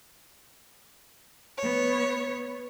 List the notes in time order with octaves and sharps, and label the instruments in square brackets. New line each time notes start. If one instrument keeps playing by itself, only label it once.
[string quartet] B3 C#5